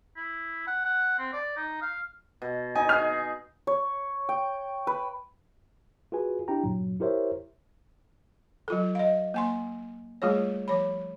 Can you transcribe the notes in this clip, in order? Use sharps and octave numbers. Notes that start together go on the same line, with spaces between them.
E4
F#5
F#5
C4
D5
D#4
F5
B2
D#4 G#5
G#4 G#5 F6
C#5
G5
B4
F4 F#4 G#4 B4 G#5
D4 E4 G4 G5 A#5
G2 A#2 F#3
E4 G4 A#4 C5 C#5 E5
F#3 F4 A4
D#5 F5
A#3 G#5 C6
G3 A3 F4 G#4 C#5
F3 C#5 B5